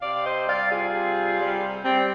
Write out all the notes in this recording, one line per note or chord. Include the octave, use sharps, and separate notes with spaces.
C3 D5 F5
C5 D#5
G3 D5 F5
F4 G#4
C3
G3
G3 C4